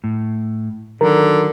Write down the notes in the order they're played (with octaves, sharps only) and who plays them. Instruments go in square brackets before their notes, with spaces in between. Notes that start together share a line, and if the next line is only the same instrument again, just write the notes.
[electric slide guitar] A2
[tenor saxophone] D3 [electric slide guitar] D#3 F#3 [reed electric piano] A#4